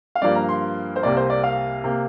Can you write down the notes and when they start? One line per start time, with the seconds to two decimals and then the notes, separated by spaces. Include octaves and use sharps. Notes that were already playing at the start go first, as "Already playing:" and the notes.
0.15 F5
0.22 G2 F3 A#3 D5
0.35 A#5
0.49 C6
0.96 C5
1.03 C2 C3 A#3 D5
1.17 C5
1.30 D5
1.43 F5
1.83 C3 A#3